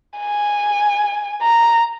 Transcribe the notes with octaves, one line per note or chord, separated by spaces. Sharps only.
G#5
A#5